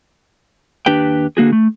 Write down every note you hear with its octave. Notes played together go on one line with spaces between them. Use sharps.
D#2 D4 G4 B4 G5
D3 A#3 F#4 G#4
A3